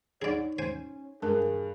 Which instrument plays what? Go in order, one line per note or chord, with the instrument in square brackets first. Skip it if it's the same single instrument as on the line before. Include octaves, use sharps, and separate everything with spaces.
[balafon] D4 D#4 F#5 [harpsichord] G#4 D5 [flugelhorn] C#5
[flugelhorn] C#4 [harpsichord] C5 G#5
[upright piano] G2 [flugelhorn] G#4 [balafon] A#4 A5